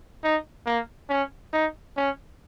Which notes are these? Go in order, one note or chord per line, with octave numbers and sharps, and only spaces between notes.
D#4
A#3
C#4
D#4
C#4